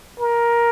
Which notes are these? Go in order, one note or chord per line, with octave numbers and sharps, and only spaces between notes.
A#4